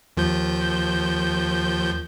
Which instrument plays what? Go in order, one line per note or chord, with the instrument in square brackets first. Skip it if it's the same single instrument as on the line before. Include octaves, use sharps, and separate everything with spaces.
[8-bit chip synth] D#2 F3 G6